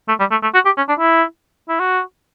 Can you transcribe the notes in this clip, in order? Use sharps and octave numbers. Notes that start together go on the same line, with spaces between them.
A3
G3
A3
A3
F#4
G4
C#4
D4
E4
E4
F#4